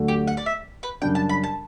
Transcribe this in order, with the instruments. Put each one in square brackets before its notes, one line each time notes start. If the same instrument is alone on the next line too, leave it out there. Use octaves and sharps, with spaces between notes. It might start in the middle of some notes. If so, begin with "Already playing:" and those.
Already playing: [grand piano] D2 D3 F#3 A3
[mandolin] G4
F#5
D5
E5
B4
[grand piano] F#2 C#3 G3 D4 [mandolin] G5
[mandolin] A5
B5
A5